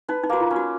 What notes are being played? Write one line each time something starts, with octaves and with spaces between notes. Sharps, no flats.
D#4 B4
D#4
A#3 F#4
F4
C#4
F#4